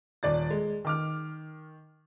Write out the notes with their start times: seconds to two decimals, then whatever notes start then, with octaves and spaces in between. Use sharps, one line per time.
0.23 D#1 D5 A6
0.50 G#3
0.85 D#3 D6 F6